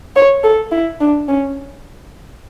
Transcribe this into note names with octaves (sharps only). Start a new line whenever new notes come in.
C#5
A4
E4
D4
C#4